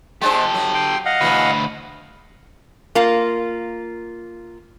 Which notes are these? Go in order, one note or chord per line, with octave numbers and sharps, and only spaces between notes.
G#3 D4 G4 A4 C5
F#3
G5 C6
D#5 F5 F#5
D2 B2 E3 F#4 B4
A#3 F4